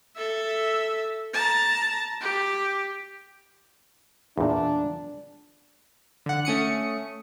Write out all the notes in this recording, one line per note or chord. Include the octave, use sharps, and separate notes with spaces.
A4 E5
A5 A#5
G4
E2 A#2 D4
D3 F#5
A3 C#4 D#6 C#7